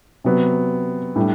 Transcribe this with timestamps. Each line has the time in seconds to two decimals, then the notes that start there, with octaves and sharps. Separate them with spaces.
0.24 C3 F#3 B3
1.16 A2 G3 D4